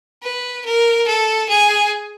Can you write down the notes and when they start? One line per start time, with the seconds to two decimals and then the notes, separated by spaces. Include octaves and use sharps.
0.22 B4
0.65 A#4
1.07 A4
1.49 G#4